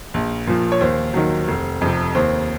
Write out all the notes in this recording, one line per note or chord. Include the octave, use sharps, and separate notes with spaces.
A#1
A#2 F3
C#5
D#2 C5
D#3 F#3
F1
F2 C3
D#2 C5